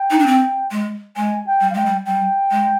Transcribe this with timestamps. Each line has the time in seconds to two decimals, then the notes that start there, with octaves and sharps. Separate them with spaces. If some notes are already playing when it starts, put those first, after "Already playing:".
Already playing: G5
0.10 D#4
0.19 D4
0.26 C4
0.71 G#3
1.16 G#3 G#5
1.46 G5
1.61 G3
1.70 F5
1.74 G#3 G5
1.85 G3
2.06 G3 G5
2.51 G#3